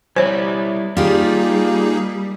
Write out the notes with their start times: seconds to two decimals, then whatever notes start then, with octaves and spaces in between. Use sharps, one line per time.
0.16 G3 E4 C5 C#5
0.97 G3 A#3 D#4 F4 G4 G#4